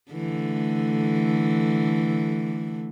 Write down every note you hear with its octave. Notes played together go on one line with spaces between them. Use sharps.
D3 E3 A3